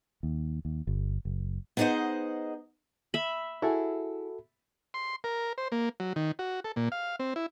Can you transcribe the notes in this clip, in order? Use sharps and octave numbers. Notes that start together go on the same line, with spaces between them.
D#2
D#2
G1
F#1
B3 D#4 G#4 C5 D#5 F#5
E5 B5
E4 F#4 G#4 A4
C6
A#4
C5
A#3
F#3
D#3
F#4
A4
A#2
F5
C4
E4